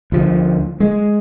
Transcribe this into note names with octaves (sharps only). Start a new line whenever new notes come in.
D2 F3
G#3